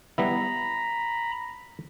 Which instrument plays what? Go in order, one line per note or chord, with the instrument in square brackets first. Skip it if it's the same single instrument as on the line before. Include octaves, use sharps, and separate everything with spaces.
[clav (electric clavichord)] G3 B3 E4 [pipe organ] A#5 B5